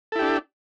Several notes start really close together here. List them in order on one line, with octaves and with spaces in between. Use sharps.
A4 E4 G4 D4